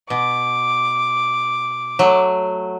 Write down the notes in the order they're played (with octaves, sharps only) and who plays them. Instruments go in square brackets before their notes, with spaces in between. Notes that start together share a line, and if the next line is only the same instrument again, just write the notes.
[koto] B2 [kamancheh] D6
[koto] F#3 A3